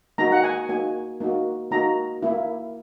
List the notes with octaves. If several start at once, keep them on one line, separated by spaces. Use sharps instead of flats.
A#3 D#4 F#4 A#5
F#5
G#5
A#3 D#4 F#4 G#5
A#3 D#4 F#4
A#3 D#4 F#4 A#5
A#3 E4